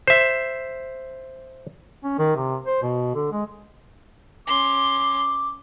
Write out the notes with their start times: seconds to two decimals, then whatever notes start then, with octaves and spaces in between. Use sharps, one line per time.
0.07 C5 E5
2.04 C#4
2.19 D#3
2.36 C3
2.66 C5
2.82 B2
3.15 D3
3.32 G#3
4.47 C#4 C6 D6